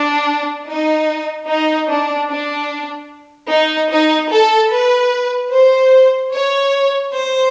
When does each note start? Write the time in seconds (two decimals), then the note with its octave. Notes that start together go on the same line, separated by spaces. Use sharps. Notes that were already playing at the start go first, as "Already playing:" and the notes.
Already playing: D4
0.66 D#4
1.48 D#4
1.88 D4
2.29 D4
3.50 D#4
3.91 D#4
4.31 A4
4.72 B4
5.52 C5
6.33 C#5
7.14 C5